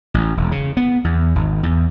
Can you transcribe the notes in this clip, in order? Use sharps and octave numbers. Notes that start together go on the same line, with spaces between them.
A1
E1
C#3
B3
E2
G#1
E2